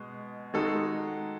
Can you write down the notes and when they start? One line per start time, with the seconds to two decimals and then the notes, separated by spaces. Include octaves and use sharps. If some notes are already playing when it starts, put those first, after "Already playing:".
Already playing: B2 G#3
0.54 D#3 G#3 D#4 F#4 A4